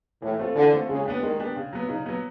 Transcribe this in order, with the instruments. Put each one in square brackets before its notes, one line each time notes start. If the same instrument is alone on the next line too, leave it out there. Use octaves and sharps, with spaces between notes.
[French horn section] A2 [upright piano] E3
[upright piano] A3 C4 F4 A4
[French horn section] D3 [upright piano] E3
[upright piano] A3 C4 F4 A4
[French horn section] C#3 [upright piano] G#3
[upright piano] B3 D4 G4
[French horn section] D#3 [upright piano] G#3
[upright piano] B3 D4 G4
C#3
F#3 B3
[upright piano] C#3 [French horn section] D#4
[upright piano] F#3 B3